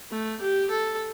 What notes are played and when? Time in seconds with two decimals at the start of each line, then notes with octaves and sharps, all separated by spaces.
0.11 A3
0.41 G4
0.70 A4